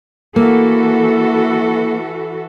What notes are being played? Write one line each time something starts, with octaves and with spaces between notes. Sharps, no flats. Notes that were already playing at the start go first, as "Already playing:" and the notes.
E3 A#3 F#4 A4